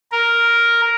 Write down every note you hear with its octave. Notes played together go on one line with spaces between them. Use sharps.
A#4